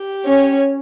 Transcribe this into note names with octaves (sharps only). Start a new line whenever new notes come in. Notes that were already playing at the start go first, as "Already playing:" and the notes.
Already playing: G4
C#4 C#5